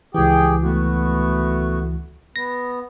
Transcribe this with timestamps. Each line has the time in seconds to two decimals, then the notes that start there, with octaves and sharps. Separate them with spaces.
0.15 C#2 E3 G4 G#4 G5
0.62 A3 B3 F#4
2.36 B3 A#6